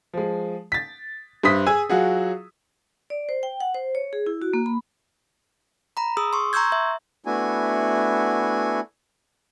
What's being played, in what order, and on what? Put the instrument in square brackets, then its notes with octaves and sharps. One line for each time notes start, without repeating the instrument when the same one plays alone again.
[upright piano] F3 G#3
A6 B6
G2 C5 E5 C6 D#6 B6
G#4 G#5 E6
F#3 F4 F#4 G#4
[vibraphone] D5
C5
G5
F#5
C5
C#5
G#4
E4
F#4
A#3
B5
[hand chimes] A#5 B5
G#4 D#6 E6
C6 C#6
A#5 C6 C#6 E6 G6 G#6
E5
[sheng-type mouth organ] A3 B3 D4 E4 F#4 G#5